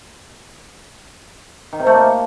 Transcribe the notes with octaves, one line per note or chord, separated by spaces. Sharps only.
D#3
C3
A3
A#3